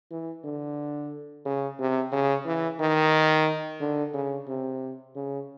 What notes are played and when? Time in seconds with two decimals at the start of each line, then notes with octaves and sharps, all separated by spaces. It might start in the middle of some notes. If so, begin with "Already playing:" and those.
0.10 E3
0.44 D3
1.45 C#3
1.79 C3
2.12 C#3
2.45 E3
2.79 D#3
3.80 D3
4.13 C#3
4.47 C3
5.15 C#3